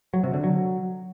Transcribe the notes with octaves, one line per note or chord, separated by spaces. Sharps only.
F#3
C3
D3
F#3